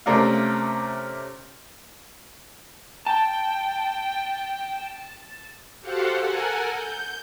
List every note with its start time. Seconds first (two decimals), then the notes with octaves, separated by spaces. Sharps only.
0.06 C3 A3 C#4 A#4 D5 F5
3.07 G5 A5
5.81 F#4 G4 A4 C5 F5 F#5
6.18 A4 A#4 F#5 G#5
6.71 G6